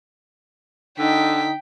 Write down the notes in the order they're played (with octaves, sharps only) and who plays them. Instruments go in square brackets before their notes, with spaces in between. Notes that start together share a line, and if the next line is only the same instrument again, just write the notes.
[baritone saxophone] D3 [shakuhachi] D#4 [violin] G5 B6